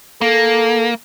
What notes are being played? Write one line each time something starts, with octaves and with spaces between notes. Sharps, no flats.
A#3 A4